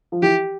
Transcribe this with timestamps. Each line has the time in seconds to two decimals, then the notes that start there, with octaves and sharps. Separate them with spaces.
0.12 F3
0.22 E3 G4